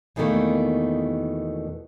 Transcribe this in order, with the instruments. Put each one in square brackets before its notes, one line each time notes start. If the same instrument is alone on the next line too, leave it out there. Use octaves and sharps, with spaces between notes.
[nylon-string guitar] E2 B2 D#3 F#3 A3 A#3